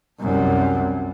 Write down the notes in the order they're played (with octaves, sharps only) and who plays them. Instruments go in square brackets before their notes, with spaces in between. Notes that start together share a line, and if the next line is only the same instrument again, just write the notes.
[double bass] C2 F#2